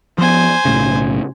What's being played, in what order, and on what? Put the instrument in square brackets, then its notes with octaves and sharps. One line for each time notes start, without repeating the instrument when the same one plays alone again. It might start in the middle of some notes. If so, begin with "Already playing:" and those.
[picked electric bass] F3 B3 [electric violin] C5 G#5
[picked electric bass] B1 A2 C#3